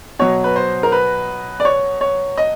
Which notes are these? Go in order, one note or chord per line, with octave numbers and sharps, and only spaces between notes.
B2 F#3 C#5
B4
C5
A#4
B4
D5
C#5
C#5
D#5